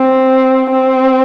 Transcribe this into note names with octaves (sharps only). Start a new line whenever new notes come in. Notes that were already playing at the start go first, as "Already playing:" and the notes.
Already playing: C4
C4